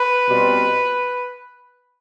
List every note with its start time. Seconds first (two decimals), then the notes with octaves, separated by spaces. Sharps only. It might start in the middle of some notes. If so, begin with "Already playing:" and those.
Already playing: B4
0.29 B2 G3 C4 F4